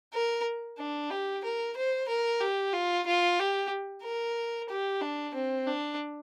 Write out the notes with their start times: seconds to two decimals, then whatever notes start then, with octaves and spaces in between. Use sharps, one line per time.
0.14 A#4
0.78 D4
1.10 G4
1.44 A#4
1.77 C5
2.08 A#4
2.41 G4
2.73 F4
3.06 F4
3.39 G4
4.04 A#4
4.70 G4
5.01 D4
5.34 C4
5.67 D4